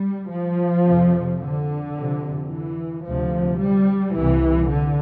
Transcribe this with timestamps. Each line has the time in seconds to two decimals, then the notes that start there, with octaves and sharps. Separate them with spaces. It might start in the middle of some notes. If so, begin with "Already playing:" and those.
Already playing: G3
0.30 F3
0.86 F2 C3
1.41 D3
1.96 F2 C3
2.51 E3
3.06 D2 C3 F3
3.61 G3
4.17 C2 C3 E3
4.71 D3